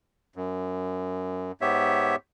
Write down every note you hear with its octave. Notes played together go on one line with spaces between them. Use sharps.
F#2
G#2 B3 G4 C#5 E5